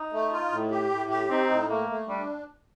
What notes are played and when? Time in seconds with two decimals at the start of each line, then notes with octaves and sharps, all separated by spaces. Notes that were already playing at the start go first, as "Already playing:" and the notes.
Already playing: D#4
0.12 A3
0.32 F4
0.52 A2
0.71 G4
0.91 A2
1.09 G4
1.30 C4 D#4
1.50 A2
1.69 A3 A#3
1.89 A3
2.08 G3 D4